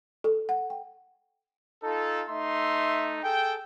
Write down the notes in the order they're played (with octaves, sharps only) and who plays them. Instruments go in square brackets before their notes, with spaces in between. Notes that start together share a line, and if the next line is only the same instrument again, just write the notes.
[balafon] A4
F#5
G5
[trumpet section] D#4 F4 A4
A3 D#4 E5 C6
G#4 A4 G5